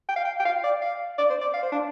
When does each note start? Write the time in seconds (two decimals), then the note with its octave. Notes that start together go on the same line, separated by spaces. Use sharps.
0.09 G5
0.16 F5
0.25 G5
0.40 G5
0.45 F5
0.64 D5
0.82 F5
1.18 D5
1.30 C5
1.41 D5
1.54 F5
1.63 C5
1.72 D4